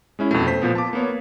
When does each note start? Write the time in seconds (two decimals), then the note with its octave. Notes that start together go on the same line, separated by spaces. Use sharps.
0.19 G#3 C#4 E4
0.31 F2 B2 A3
0.47 C5 B6
0.62 A#2 F3 B3
0.75 A5 D6
0.93 A#3 B3 C#5